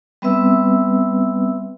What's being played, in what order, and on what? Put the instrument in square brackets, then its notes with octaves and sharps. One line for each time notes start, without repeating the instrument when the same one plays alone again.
[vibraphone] G3 B3 C4 B4 E5 E6